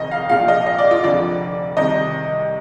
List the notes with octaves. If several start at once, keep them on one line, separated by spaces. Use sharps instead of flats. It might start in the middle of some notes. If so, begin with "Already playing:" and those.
Already playing: F1 F2 C3 D#3 D#5
F5
A#1 A#2 F3 F5
D#5
D#5
D5
F4
F1 F2 D3 D5
C2 C3 D#3 D#5